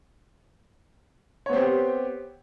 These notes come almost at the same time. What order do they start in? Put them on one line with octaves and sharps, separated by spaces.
C#5 B3 C4 G4